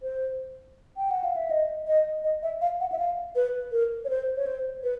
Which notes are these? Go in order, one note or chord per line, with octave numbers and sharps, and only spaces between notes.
C5
G5
F#5
F5
E5
D#5
D#5
D#5
E5
F5
F#5
E5
F5
B4
A#4
C#5
C5
C#5
C5
B4